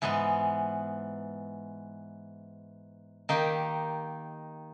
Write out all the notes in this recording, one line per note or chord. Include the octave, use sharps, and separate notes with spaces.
G#2 E3 G#3 B3
D#3 A#3 D#4 G4